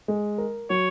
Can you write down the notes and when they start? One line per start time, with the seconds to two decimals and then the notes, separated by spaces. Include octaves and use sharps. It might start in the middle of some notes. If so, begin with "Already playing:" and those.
0.08 G#3
0.38 A#4
0.70 F#3 C#5